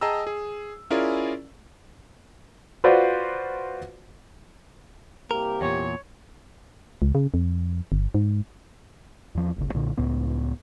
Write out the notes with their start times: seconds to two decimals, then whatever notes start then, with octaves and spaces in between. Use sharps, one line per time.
0.01 G#4 D#5 G5 A5 A#5 E6
0.27 G#4
0.90 C#4 E4 F4 G#4 A#4 D5
2.84 F4 F#4 B4 C5 D5
5.31 C2 A#3 G4 A#4
5.61 E2 A#2 C#5
7.02 C#2
7.15 C#3
7.34 F2
7.92 G1
8.14 G#2
9.35 E2 F3
9.56 D1 G1 C#3
9.74 B1 A#2 D3
9.97 C#2 A2 B3